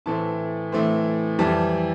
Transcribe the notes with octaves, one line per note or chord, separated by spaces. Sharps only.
A2 E3 A3 C4 A5
A2 E3 A3 C4
F2 E3 G3 A5